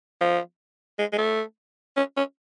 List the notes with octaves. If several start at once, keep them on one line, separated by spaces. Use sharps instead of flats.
F3
G#3
G#3
A3
C#4
C#4